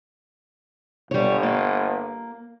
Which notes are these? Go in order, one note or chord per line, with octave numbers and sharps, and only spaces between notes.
G1 G3 C#5
A#3